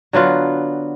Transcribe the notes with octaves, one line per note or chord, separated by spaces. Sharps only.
D3 F#3 B3 F4